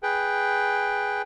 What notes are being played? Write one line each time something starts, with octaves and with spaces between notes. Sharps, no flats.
G#4 B4 G5